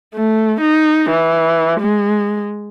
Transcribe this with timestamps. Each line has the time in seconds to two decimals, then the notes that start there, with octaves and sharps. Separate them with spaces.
0.14 A3
0.61 D#4
1.10 E3
1.81 G#3